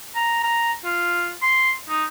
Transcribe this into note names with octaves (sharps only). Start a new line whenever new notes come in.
A#5
A#5
F4
C6
D#4